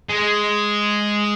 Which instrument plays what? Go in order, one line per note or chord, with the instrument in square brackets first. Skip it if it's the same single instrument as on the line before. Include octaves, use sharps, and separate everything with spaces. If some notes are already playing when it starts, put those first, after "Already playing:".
[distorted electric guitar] G#3